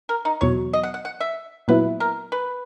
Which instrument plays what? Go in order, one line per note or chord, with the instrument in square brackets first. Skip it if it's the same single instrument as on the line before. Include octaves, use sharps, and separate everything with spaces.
[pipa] A#4
D#4
[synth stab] E2 B2 F#3 [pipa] C#5
[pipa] D#5
F#5
F#5
F#5
E5
[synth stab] A#2 F#3 B3 E4 [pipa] B4
[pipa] A#4
B4